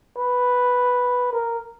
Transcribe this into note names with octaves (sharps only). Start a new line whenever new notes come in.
B4
A#4